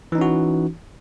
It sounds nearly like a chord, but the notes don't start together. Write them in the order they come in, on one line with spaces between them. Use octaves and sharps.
E3 D#4 C#4 F#4